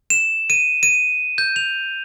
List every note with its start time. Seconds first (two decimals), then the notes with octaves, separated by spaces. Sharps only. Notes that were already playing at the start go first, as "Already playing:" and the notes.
0.10 E7
0.50 D#7
0.83 D#7
1.38 G6
1.56 F7